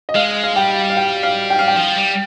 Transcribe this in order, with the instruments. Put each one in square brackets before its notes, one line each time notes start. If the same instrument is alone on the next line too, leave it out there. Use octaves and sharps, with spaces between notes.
[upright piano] D#5
[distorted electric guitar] G#3 [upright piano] F5
[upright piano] F5
[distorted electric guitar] G3 [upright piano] G5
[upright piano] F5
G5
F5
G5
F5
G5
[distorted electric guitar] F3
G3